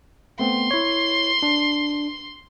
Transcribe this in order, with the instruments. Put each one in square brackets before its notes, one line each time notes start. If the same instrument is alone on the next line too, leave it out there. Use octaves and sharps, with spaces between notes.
[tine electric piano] A3 B3 C4 [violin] C6
[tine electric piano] E4 C#5
D4